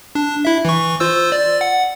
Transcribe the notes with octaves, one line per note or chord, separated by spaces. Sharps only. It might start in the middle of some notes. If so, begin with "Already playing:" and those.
D4
E4 E5
E3 C#6
F4 C5 E6
D5
F#5